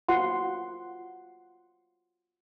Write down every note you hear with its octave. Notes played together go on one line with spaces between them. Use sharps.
F4 F#4 F#5 C6